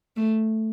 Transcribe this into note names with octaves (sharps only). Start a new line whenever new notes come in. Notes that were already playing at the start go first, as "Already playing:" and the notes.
A3